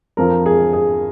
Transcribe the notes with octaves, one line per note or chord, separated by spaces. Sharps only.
F2 F3 A#4
G#4
G#4